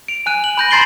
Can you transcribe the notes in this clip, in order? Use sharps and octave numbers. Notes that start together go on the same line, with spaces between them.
D7 F7
G#5 F#6 D#7
F#7
B5 G6 A#6
A#5 C6 A6 C7 D7 G7